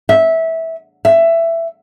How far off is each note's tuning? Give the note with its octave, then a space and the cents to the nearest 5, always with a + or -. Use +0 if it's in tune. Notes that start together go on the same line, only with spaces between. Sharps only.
E5 -15
E5 +15